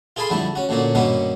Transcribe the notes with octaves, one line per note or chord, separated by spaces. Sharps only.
F4 G#4 A4 G#5 B5 C6
F2 D3 G3 A3 E4
C#4 F#4
D2 A#2 D3 A#3 C#4
G2 B2 D#3 A#3 B3 C#4